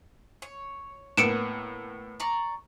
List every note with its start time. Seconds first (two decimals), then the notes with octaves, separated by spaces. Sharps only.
0.42 C#5
1.17 A2 A#3 B3 C#7 D7 E7
2.20 D5 A#5 C#6